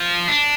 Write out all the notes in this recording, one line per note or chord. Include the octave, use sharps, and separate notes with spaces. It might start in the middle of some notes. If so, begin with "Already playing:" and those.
Already playing: F3
D4